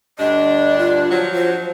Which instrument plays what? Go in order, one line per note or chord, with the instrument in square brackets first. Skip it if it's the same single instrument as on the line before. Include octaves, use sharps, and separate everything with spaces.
[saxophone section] D2 G2 D4 [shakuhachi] D#5
[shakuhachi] F4
[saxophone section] F3 F#3
[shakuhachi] C5